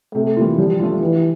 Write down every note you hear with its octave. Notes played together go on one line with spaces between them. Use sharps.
C3 A3
E3 G3 A#3 F4
F3 G3
A3 D4 F4
E3 G3